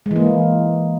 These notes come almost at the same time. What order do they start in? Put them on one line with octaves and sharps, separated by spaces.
G#3 E3 A#3